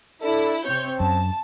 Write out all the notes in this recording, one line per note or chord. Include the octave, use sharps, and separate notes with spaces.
D4 E4 A4
C3 C4 C#5 G6
F#2 A5